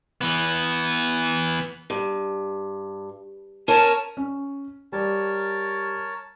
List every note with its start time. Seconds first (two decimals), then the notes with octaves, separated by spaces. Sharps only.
0.21 E3 B3
1.90 G2
3.68 C#4 A#4 C#5 A5
4.17 C#4
4.92 G3 A#4 C#5 A5